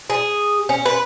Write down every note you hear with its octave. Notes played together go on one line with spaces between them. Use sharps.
G#4
C#4
B4